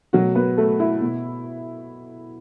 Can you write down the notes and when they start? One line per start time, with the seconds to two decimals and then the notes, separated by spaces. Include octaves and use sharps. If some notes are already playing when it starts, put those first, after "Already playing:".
0.13 B2 F#3 A3 F#4
0.35 B3 B4
0.57 A3 A4
0.80 E4
1.01 B2 B3